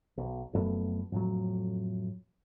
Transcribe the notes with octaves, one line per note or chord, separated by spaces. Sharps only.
B1
F1 F#2 A3 B3
F2 A2 F#3